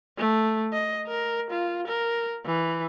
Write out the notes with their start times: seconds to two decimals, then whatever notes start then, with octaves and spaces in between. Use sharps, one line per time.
0.18 A3
0.73 D#5
1.08 A#4
1.51 F4
1.88 A#4
2.46 E3